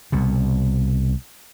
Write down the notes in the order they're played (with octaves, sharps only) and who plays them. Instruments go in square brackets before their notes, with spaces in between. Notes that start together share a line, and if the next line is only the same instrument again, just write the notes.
[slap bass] C2 B2